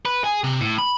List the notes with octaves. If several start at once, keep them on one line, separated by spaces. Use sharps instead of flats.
B4
G#4
C3
A2
B5